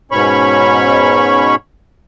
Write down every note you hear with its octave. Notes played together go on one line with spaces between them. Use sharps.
G#2 B2 C#4 C#5 B5 C#6